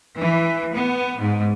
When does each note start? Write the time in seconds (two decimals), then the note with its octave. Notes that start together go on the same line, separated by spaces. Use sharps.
0.18 E3
0.75 B3
1.19 G#2